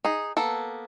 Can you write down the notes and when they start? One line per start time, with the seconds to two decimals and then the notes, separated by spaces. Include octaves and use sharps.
0.05 D#4 G#4
0.37 A#3 B3 A4